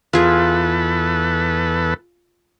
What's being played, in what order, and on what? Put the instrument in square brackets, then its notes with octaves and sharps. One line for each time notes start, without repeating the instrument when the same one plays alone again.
[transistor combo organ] E2 A4 B4 [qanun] F4 G#4